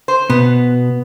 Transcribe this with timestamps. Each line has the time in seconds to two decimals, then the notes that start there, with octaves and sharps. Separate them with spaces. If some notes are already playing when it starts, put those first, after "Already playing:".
0.08 C5
0.30 B2 B3